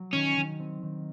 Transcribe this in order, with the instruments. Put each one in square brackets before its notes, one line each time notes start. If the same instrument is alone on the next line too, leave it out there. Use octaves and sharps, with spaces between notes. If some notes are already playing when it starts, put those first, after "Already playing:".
Already playing: [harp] F#3
[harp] D#3 [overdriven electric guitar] C#4
[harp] D#3
C4
D#3